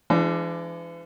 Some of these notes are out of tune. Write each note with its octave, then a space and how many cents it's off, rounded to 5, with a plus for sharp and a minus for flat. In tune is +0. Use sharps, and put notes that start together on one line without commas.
E3 +40 G#3 +0 D4 +5